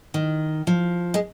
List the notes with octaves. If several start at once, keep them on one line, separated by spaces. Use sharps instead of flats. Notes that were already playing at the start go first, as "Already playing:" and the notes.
D#3
F3
G#3